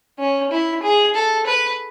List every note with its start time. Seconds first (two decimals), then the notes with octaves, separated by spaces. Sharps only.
0.19 C#4
0.51 E4
0.83 G#4
1.14 A4
1.46 B4